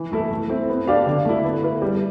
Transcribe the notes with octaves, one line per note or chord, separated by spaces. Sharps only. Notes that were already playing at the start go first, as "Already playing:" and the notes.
Already playing: E3
A3 E4 A4
A3
C4 E4
B3
D4 G4 D5 F5
D3
A3 E4
B3
E4 B4
G3